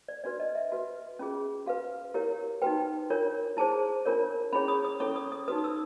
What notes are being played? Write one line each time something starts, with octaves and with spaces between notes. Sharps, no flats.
D5
D4 F#4 B4 D5
D#5
E5
F#4 B4
C#4 F4 G#4
F#4 B4 F5
E4 G4 A#4 C#5
D#4 F#4 B4 G5
D4 F4 A#4 C#5
E4 G#4 C5 A5
D4 F4 A#4 C#5
C#4 E4 G#4 C#5 B5
D#6
D#6
C#4 E4 A4 C#5 C#6
D#6
D#6
D#4 F#4 B4 D#6
D#6
E6